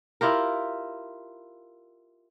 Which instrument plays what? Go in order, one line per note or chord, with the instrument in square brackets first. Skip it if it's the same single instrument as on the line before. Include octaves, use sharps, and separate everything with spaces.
[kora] E4 F4 G4 A#4